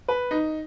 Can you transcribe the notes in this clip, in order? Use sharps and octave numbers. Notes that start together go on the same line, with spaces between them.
B4
D#4